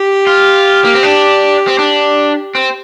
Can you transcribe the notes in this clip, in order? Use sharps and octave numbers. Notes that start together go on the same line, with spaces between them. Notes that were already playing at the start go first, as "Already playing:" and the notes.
Already playing: G4
F4
A#3
C4
D4
C4
D4
C4